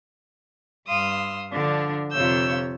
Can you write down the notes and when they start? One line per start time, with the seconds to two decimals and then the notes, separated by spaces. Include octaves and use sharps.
0.88 G2 F5 C6 D#6 E6
1.51 D3 F3 D4
2.13 F2 C3 F4 C#5 E6 G6